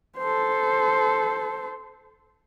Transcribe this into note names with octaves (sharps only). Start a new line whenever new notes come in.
A4 C5